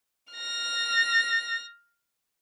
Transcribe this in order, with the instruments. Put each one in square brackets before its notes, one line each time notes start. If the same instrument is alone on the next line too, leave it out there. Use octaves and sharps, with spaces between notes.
[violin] F6 A#6